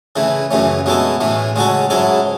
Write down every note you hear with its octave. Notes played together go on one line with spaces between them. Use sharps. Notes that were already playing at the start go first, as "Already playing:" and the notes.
C#3 E3 A3 E4
F#2 C#3 E3 A3 C#4
B2 G#3 C#4 E4 A4
A2 E3 A3 C#4
C#3 G#3 C#4 F#4 A4
G#2 F#3 C#4 E4 A4